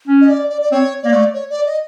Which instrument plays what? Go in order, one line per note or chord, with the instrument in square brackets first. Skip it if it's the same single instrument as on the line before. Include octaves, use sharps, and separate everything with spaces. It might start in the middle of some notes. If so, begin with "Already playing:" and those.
[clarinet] C#4
[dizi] D#5
D5
D5
D5
[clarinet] C4 [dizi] C#5
[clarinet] A#3 [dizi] D5
[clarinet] A3
[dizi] C#5
D5
D#5